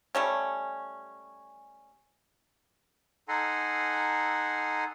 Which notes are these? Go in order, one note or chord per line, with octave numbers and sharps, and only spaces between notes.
G3 A3 C#4
D#4 A4 F#5 G#5 A#5 C6